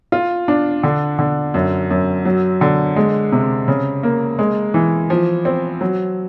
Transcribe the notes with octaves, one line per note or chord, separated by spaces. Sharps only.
F4
D4
D3
D3
F#2
F#2
F#3
D3
G#3
C3
C#3
A#3
G#3
E3
F3
C4
F#3